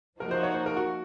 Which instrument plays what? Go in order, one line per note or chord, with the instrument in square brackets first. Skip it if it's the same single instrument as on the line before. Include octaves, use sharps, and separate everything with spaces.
[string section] F3 A#3 D#4 F#4 [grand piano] A#4
[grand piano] C5
C#5
C5
A#4
F#4